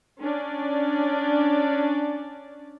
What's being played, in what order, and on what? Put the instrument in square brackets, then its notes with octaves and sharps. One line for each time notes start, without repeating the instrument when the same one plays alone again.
[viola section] C#4 D4 D5